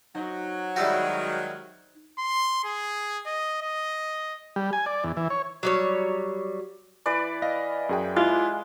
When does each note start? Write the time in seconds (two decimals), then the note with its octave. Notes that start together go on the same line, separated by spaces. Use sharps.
0.15 F#3 D#4 C5 D#5
0.76 D#3 G3 G#3 E4 F#4
2.18 C6
2.64 G#4
3.26 D#5
3.62 D#5
4.56 G3
4.73 G#5
4.86 D5
5.04 E2
5.17 E3
5.30 C#5
5.63 F#3 G3 C#5
7.06 E3 B4 D5
7.42 D#5 F5 A#6
7.89 F#2 G#4 G5
8.16 G#3 E4 F4 G4 F#6